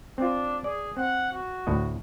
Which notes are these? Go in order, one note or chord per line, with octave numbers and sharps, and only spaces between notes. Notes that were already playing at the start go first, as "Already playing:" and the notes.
C4 D4 F4
G#4 D5
C4 F#5
F#4
D2 A2 D#5